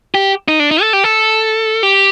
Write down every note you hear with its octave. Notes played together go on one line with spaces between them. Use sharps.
G4
D#4
D4
D#4
A4
G4
A4
G4